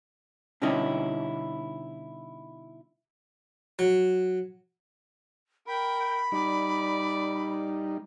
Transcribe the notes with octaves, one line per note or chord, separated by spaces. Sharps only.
B2 D3 G3 C#4 D#4 E4
F#3
A#4 G5 B5
G3 D#4 D5